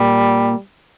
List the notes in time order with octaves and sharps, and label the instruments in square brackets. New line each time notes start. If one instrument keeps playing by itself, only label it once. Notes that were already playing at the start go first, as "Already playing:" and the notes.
Already playing: [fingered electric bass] A#2 A#3 [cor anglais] G3